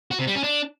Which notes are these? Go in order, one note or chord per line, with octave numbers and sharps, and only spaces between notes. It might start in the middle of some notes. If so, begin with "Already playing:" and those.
F#4
C3
G3
C#4
D4